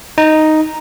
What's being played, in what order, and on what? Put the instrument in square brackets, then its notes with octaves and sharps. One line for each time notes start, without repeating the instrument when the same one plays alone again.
[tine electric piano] D#4